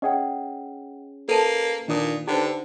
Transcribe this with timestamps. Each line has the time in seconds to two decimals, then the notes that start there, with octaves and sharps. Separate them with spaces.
0.02 C#4 G#4 D#5 F#5 G5
1.29 A#3 A4 B4 A5 D#7
1.88 A#2 D#3 D4 D#6
2.28 D3 D#4 G4 B4 C5